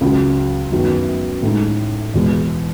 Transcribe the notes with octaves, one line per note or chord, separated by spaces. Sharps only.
C#2 C#3 F#3
F#2 D#3 F#3 B3
A2 G#3 D#4
E2 B2 G#3